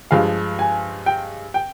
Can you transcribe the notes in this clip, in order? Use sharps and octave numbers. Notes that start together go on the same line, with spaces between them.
G2 F3 G#3 F5
G#5
G5
G5